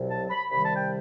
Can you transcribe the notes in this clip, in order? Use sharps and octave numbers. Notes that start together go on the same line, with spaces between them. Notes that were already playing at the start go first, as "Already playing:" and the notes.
Already playing: C2 B2 F#3
A5
B5
C2 C3 D#3 G3 B5
A5
G5